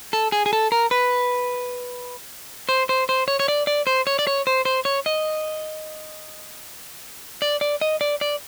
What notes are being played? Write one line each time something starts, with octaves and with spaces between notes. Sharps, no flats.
A4
G#4
G#4
A4
A#4
B4
C5
C5
C5
C#5
C#5
D5
D5
C5
C#5
D5
C#5
C5
C5
C#5
D#5
D5
D5
D#5
D5
D5